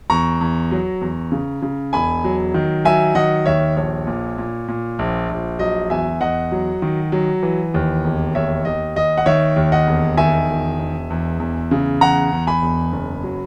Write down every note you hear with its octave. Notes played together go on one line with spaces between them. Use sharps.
E2 A#5 C#6
E2
F#3
E2
C#3
C#3
E1 G#5 B5
F#3
D#3
F#3 E5 G#5
D#3 D#5 F#5
D#2 C#5 E5
A#1 C#5
A#2
A#2
A#2
A#1
A#1
F#3 D#5
E2 E5 G#5
E2 D#5 F#5
F#3
D#3
F#3
E3
D#2
E1
D#2 C#5 E5
D#2 D#5
D#2 D#5
F#5
D#3 C#5 E5
D#2
D#5 F#5
E1
D#3 E5 G#5
E1
E1
E2
E2
C#3
E2 F#5 A#5
E2
G#5 B5
E1
F#1
F#3